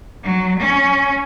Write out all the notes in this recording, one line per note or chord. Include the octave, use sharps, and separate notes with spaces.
F#3
C#4